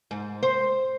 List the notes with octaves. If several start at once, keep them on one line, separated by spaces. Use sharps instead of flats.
G#2
C5